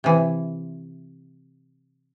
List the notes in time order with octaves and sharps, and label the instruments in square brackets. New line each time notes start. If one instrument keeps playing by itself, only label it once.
[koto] C3 E3